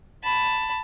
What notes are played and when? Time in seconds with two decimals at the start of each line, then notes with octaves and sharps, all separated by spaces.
0.24 A5 B5